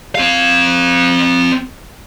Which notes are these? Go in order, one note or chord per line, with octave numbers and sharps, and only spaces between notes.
C4 F5